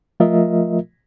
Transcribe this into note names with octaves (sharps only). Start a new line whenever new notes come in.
F3 A3 F4 A#4 D#5 E5